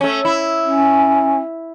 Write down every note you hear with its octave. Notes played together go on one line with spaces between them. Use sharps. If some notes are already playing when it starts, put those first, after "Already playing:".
A3 C#4
E4
C#4